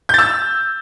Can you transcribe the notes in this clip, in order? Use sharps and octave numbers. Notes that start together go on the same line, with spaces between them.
E6 G6 A6